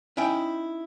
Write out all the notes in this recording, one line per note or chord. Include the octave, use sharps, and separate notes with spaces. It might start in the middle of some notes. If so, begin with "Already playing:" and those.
C#4 D#4 E4 G5